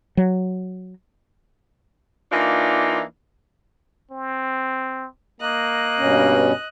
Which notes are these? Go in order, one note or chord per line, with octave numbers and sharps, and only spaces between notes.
F#3
E3 A#3 D4 D#4 F4
C4
A#3 D#5 F#6
G2 B2 C#4